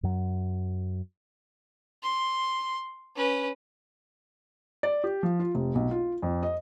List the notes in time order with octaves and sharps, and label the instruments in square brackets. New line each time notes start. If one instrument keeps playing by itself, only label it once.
[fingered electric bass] F#2 F#3
[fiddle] C6
C#4 B4
[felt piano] D5
G4
F3
F4
F1
B1
F4
F2
D#5